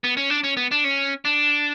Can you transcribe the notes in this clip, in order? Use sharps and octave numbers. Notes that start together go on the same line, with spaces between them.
B3
C#4
D4
C#4
B3
D4
C#4
D4